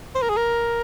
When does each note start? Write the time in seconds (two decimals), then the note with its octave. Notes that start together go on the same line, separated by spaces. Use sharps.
0.15 C5
0.22 A#4
0.29 G#4
0.37 A#4